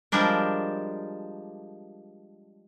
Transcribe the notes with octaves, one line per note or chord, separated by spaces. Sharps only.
F3 G3 G#3 D4 A#4